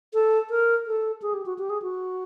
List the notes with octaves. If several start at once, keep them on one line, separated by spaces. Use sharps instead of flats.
A4
A#4
A4
G#4
G4
F#4
G4
G#4
F#4